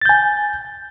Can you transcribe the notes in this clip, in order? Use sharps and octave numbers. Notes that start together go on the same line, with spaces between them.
G#5 G6 A6